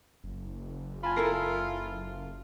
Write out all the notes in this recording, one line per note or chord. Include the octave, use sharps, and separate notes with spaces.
F#1
F4 G#5 A5 B5
E4 A4 A#4 C7